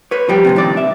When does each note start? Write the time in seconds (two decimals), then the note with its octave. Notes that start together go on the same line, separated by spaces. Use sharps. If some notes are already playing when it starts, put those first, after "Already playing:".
0.11 B4 C#5
0.29 F3 G3 G4
0.45 C#2 F#2 C3
0.56 A2 D#3 D5
0.77 E5